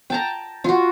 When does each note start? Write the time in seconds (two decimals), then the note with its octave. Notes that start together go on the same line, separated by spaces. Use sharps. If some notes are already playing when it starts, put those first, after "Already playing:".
0.10 G5 A5 A#5
0.64 F4 F#4